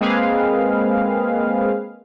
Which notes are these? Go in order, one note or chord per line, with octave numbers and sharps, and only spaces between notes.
G#3 A#3 C4 G#4 B4 F5